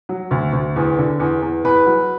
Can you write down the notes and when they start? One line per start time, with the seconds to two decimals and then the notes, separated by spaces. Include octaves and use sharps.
0.09 F#3
0.31 D2
0.53 D2
0.76 E2
0.98 D3
1.20 E2
1.42 E2
1.64 E2 B4
1.86 F#3